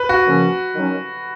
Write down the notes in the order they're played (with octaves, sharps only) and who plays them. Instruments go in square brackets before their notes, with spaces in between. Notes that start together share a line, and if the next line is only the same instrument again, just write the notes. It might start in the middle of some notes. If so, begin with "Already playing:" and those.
Already playing: [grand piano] B4
F#4
[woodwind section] F#2 C#3 F3 A#3 C#4
D#3 F#3 C#4